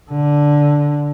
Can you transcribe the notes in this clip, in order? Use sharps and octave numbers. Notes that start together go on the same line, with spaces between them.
D3